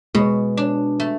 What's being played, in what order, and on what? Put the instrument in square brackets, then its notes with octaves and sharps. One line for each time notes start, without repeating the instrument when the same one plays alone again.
[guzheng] B2 [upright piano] G#3
[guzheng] D4
A3